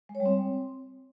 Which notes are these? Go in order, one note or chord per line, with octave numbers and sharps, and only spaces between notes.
G#3
C#5
G3
C4